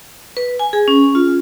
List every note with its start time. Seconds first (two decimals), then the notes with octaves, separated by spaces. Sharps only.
0.37 B4
0.60 G#5
0.73 G#4
0.88 C#4
1.15 F4